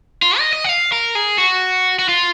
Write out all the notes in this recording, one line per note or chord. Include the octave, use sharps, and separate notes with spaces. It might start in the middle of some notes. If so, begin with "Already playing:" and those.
F4
D#5
D#5
F#5
F5
A#4
G#4
F#4
F#4
F4